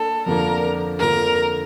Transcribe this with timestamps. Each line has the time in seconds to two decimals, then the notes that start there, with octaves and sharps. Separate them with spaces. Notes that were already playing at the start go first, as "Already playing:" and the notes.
Already playing: A#3 D4 A4
0.26 F2 D3 F3 A#3 D4 A#4
0.99 F2 D3 F3 A#3 D4 A#4